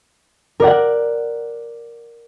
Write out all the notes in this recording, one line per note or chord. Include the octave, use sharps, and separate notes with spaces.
A#4 D5 F#5